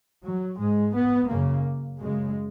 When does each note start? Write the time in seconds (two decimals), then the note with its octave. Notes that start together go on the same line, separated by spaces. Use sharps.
0.23 F#3
0.57 G#2 G#3
0.93 B3
1.28 F#2 C#3 A#3
1.98 F#2 C#3 G#3